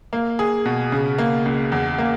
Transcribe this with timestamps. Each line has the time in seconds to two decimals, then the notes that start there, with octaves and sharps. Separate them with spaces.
0.13 A#3
0.39 G#4
0.65 B2
0.92 C#3
1.18 A#3
1.45 C#2
1.72 E2
1.98 A#3